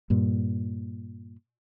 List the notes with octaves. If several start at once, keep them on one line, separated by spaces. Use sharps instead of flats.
G2 A#2